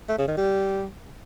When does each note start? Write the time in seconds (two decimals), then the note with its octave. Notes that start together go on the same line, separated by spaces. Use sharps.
0.09 A3
0.18 C#3
0.28 D#3
0.37 G3